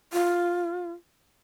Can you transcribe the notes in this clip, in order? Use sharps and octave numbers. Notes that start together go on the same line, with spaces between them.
F4